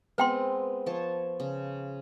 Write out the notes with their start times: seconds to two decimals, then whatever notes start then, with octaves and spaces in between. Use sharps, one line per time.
0.18 G#3 B3 C4 B4 G5 C6
0.86 F3 C#5 A5
1.40 C#3